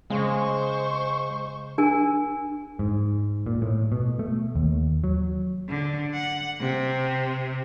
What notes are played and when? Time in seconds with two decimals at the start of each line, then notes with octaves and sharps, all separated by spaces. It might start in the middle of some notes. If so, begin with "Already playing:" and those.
0.10 C#3 G#3 C5 C#6
1.78 D4 A#4 G#5
2.79 G#2
3.46 A#2
3.62 A2
3.92 B2
4.19 A3
4.56 D#2
5.04 F#3
5.69 D3
6.14 F#5
6.60 C3